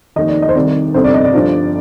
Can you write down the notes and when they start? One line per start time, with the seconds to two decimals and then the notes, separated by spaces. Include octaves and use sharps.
0.16 F1 D#2 D#3 D#5
0.29 D5
0.42 D#5
0.49 C5
0.55 C2 C3 D#3 D5
0.94 G1 F2 C3 C5
1.04 D5
1.14 D#5
1.24 D5
1.33 G1 G2 F3